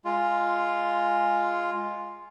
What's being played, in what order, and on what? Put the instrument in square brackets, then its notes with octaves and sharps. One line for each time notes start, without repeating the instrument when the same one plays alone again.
[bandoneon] G#3 F4